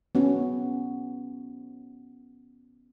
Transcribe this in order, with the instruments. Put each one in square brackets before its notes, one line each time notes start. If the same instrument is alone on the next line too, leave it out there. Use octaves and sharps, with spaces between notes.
[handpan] B3 C#4 F#4